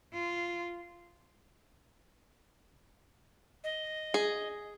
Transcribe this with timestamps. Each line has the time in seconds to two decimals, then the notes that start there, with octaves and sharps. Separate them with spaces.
0.13 F4
3.64 D#5
4.14 G#4